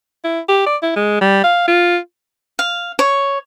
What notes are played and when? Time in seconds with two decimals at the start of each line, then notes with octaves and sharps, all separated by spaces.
0.24 E4
0.49 G4
0.66 D5
0.83 E4
0.96 G#3
1.21 G3
1.44 F5
1.68 F4
2.59 F5
2.99 C#5